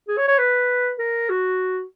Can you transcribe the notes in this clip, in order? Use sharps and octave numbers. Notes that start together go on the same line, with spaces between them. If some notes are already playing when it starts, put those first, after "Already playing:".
G#4
C#5
C#5
B4
A#4
F#4